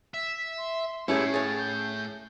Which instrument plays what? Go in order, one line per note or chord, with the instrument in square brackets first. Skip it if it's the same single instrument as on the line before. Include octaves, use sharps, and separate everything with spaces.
[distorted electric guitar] E5 [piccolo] B6
[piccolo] C6
[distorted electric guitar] A2 A3 [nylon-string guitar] C#4 [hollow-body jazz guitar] E4 G4 G#4 [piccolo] C#7
[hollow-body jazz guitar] G#4 C#5 [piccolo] A6
[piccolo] G6